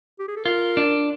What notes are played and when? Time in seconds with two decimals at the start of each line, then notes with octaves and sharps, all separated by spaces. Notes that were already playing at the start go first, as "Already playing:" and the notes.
0.19 G4
0.28 G#4
0.36 A4
0.45 F4 A#4
0.77 D4